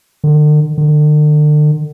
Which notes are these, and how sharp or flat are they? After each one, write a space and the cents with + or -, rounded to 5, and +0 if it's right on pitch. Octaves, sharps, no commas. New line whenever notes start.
D3 +40
D3 +40